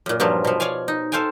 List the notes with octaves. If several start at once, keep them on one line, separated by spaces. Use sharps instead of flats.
F#2 A#2
G2 A#2 F3 F#3
B2 F3
C#5 D5 F5 G#5
D#4
A4 C5 F5 G5 G#5